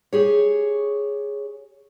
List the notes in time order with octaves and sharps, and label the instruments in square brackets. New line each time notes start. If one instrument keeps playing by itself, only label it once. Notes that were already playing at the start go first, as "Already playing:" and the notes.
[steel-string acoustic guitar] G4 G#4 C#5